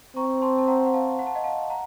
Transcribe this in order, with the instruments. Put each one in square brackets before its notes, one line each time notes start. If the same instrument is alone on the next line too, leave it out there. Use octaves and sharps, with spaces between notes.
[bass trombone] C4 [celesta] A#5 C#6
[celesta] A5 C6
A5
F#5 A#5
F#5
F5 A5
F#5
A5
D#5 F#5
F5 A5
F#5 A#5